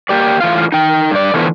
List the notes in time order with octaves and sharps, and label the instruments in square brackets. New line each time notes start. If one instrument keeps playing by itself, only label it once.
[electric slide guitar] A#3 G4 D5
A2 E3 F4 F5
D#4 G5
G2 D5
D3 E3 F3 A3 B3